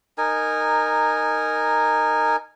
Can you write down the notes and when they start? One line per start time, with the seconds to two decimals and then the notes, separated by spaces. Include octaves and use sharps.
0.18 D#4 A#4 G#5